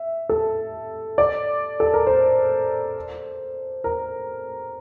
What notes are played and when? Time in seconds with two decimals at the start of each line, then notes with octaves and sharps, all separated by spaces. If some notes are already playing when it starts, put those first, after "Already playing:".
Already playing: E5
0.29 A4
1.18 D5
1.80 A4
1.94 A#4
2.07 C5
3.84 A#4